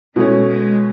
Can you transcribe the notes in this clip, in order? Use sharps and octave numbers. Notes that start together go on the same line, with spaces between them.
B2 G#3 A3 C#4
G#3